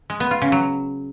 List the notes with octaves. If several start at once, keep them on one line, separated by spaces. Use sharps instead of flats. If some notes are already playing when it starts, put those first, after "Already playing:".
G#3
B3
F4
C#3
F#3